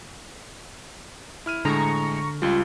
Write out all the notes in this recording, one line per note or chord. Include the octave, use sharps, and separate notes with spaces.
E4 F6 D#7
A2 D3 G#3 A#5 C#6
C#2 G3 F4